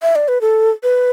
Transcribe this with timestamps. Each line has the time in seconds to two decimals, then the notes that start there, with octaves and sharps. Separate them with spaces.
0.02 E5
0.15 D5
0.28 B4
0.41 A4
0.83 B4